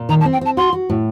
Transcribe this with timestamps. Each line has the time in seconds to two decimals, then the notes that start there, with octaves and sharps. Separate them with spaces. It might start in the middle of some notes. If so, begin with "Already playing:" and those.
Already playing: A#2
0.09 D#3 A#5
0.21 A5
0.25 C4
0.33 G5
0.41 C4 A5
0.57 F#4 C6
0.73 F#4
0.89 A2